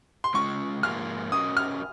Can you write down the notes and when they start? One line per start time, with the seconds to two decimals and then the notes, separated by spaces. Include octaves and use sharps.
0.24 C6
0.34 G#3 C#4 F4 C#6
0.83 G#2 F3 A#3 F4 G#4 F6
1.32 F#3 C#4 F#4 A#4 D#5 D#6
1.57 F6